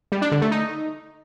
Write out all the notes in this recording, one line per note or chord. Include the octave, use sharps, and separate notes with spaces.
G3
D4
D3
A3
D#4